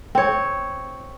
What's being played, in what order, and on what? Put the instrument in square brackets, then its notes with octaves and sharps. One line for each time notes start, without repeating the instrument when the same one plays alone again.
[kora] C4 C#5